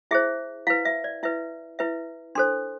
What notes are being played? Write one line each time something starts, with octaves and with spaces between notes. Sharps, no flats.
E4 G#4 C5 E5
E4 B4 F5
E5
D5
E4 B4 E5
E4 B4 E5
D4 A4 C5 C6